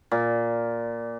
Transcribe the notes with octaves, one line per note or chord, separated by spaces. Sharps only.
A#2